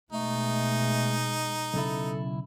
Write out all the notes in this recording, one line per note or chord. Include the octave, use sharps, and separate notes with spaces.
B2 G#3 A3 D#4
B1 C#3 E4 A4